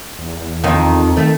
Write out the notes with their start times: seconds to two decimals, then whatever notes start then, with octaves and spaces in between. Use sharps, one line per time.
0.19 E2
0.64 F2 D#3
1.17 D#3 A3